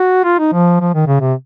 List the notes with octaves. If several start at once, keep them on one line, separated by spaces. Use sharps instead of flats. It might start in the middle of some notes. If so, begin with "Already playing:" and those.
Already playing: F#4
F4
D#4
F3
F3
D#3
C#3
C3